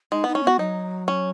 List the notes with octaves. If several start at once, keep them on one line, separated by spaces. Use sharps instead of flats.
G#3 D#4
B3 D#4
C#4
B3 F#4
F#3 D#4
C#4